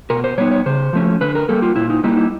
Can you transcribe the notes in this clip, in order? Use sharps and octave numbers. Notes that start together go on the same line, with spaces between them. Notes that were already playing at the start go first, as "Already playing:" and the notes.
B2 A#4
C5
G3 B3 D#4 C#5
C#5
C#3 C5
F3 A3 C#4
D3 B4
A#4
G3 A#3 A4
F4
A#2 E4
D#4
G3 A#3 D#4 E4
E4